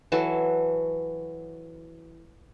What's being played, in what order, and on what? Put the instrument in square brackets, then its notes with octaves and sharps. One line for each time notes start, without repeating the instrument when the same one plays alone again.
[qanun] E3 F#3 A4